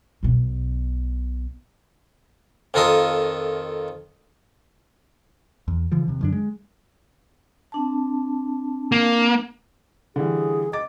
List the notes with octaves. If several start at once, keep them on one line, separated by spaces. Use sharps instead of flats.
B1 B2
F2 D#3 F4 A4 A#4 D#6
E2
C#3 E3 F3
D#2 C3
F#2 D3 D4
G#3
C4 D4 A5
A#3
D3 E3 G3 G#4
D#5 D6 A6